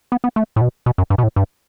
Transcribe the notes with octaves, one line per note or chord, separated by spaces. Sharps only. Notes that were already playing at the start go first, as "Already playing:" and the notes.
B3
B3
A3
A2
B2
B2
F#2
G2
B2
A2
G2